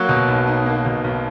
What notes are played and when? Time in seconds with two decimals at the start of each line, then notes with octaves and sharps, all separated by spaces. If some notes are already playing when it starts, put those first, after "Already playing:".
Already playing: F#3 A#3
0.09 B2
0.28 B1
0.47 D#4
0.66 A#3
0.85 B2
1.04 B1